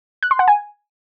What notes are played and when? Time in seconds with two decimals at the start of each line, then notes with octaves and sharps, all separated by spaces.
0.23 F#6
0.31 C6
0.39 F#5
0.48 G#5